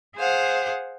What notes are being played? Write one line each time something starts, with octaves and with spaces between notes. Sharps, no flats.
G#4 C5 F5 F#5